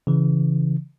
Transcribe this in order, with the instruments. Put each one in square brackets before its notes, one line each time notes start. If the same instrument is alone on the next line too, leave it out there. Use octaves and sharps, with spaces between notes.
[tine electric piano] C#3 E3